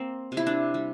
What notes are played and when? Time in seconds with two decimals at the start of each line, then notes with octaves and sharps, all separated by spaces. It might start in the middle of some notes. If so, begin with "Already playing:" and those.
Already playing: A#3 C4
0.32 C3
0.37 E4
0.47 D4
0.74 G3